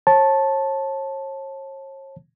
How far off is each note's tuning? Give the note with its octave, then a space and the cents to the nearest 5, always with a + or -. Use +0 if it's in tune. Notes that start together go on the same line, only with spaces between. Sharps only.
C#5 -40 A5 -5